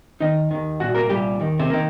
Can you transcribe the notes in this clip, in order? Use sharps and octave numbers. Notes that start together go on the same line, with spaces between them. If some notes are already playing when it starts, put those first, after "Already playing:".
D#2 D#3 D#4 D#5
D#2 D#3
C2 A#2 F#4 F#5
A#3 A#4
C2 A#2 G3 G4
D#2 D#3
C3 C4
D#3 A#3